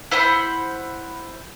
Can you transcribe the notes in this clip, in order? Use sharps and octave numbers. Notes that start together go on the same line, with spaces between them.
E4 C5 F#5 B5